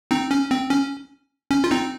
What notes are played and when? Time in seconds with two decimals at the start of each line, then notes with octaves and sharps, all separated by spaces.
0.11 C4 D#4
0.31 C#4
0.51 C4
0.70 C#4
1.51 C#4
1.64 F4
1.71 C4 D#4